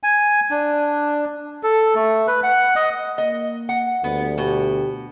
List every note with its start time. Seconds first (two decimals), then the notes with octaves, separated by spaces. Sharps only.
0.03 G#5
0.51 D4
1.63 A4
1.95 A3
2.28 B4
2.43 F#5
2.76 D#5
3.18 A#3 D#5
3.69 F#5
4.04 D2 G3 B3
4.38 B2 G4